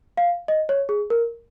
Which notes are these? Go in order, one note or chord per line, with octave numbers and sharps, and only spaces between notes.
F5
D#5
C#5
G#4
A#4